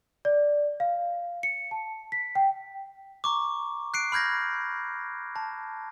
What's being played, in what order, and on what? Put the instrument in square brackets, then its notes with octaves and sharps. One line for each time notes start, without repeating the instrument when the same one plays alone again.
[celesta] D5
F5
C#7
A5
B6
G5
[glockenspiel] A#5 C#6 D6
F#6 C7 D7
B5 F6 G6 G#6 A#6
A5